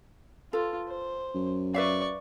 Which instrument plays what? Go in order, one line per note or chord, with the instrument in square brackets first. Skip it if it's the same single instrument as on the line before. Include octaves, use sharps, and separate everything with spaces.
[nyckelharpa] F4 [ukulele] A4 B4
[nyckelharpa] C5
[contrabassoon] F#2
[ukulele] B4 E5 F5 [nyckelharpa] D5 C#6